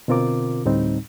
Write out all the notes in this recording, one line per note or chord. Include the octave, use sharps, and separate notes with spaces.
B2 D3 C4 F4 A#4 D6
D2 A2 G3 C4 D#4